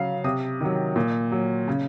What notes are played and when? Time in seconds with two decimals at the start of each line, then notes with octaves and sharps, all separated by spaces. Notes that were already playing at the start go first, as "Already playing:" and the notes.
Already playing: C#3 F#3 F5
0.24 C3 D#6
0.61 D#3 F#3
0.96 A#2
1.32 F#3
1.68 C#3